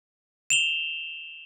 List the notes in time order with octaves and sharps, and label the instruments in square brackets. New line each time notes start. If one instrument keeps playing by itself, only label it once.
[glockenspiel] E7 F7 G7